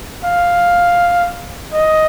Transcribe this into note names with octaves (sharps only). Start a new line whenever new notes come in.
F5
D#5